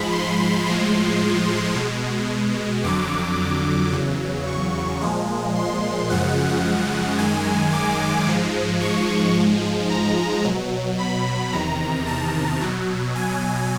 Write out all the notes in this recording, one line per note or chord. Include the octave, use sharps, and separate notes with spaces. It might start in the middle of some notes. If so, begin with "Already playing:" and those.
Already playing: G#2 F3 G#3 B5
C6
A2 F3 G#3
B2 G#3
F2 D3 F#3 D6
E2 C#3 F#3
C#6
A#2 F3 G#3
C6
F#2 C#3 F3 G#3 F#5
F#2 D#3 G#3 G#5
D6
G#2 F3 G#3
C#6
G#2 F3 G#3
A#5
B2 F#3
B5
E2 C3 D#3 A#5
A5
B2 F#3
G#5